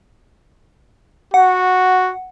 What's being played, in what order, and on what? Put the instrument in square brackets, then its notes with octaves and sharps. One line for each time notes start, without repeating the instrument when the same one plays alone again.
[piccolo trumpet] F#4 [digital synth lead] F#5